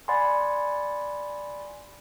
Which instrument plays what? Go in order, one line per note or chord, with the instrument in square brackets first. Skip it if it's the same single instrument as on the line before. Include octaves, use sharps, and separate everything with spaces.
[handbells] D5 F#5 G#5 B5 C6